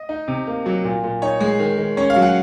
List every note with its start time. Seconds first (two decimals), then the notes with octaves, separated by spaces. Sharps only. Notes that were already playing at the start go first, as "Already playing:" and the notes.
Already playing: D#5
0.09 D#4
0.28 C3
0.47 A#3
0.66 F#3
0.84 A#2
1.03 A#2
1.22 D#4 C#5
1.40 G#3
1.59 D#3
1.78 D#3
1.97 C#4 C#5
2.10 F5
2.16 F#3
2.22 F#5